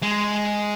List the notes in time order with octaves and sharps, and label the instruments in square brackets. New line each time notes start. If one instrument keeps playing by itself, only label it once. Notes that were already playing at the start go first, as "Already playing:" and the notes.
[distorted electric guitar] G#3